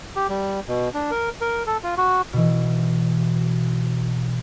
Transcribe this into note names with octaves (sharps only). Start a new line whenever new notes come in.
G4
G3
B2
D4
A#4
A#4
A4
F4
F#4
B2 E3